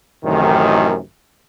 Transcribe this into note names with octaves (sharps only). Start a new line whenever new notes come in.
A1 F#2 A2 C3 D#3